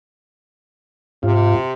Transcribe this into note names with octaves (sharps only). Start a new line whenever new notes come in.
G#2 C3 F4